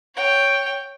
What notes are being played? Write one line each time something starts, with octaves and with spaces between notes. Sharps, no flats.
C#5 G5